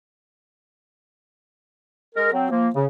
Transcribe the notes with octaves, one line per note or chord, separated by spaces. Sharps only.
G#3 A#4
F#3 C4
F3 A#3
C#3